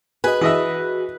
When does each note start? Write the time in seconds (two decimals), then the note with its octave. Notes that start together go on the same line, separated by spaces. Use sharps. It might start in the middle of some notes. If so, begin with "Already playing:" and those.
0.24 F#4 G#4 B4 D#5 G#5
0.41 E3 F#4 G#4 D#5 E5